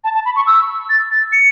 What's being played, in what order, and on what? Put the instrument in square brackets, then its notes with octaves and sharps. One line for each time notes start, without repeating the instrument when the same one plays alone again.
[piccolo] A5
A5
B5
C#6
E6
A6
A6
C#7